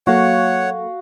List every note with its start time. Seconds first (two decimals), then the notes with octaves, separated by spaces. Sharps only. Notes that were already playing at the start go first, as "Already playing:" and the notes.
0.07 F#3 A#3 F#4 A4 C#5 F5 F#5